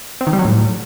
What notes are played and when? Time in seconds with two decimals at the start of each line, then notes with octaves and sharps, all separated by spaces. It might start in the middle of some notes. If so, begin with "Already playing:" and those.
0.21 C4
0.27 D#3
0.33 G3
0.39 F#3
0.45 A2